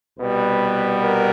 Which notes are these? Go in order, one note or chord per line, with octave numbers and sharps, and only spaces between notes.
C2 B2 G3 B3 B4
A#4